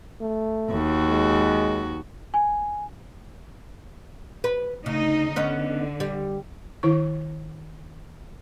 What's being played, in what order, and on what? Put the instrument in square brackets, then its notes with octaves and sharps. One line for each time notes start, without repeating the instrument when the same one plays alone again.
[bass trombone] A3
[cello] D#2 F#4
[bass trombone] G#3
[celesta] G#5
[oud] B4
[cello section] D2 D#4 D#5 [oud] C#3
[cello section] D3 [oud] B3 C#4 D#4
[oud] G3
[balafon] D#3 E4 C#6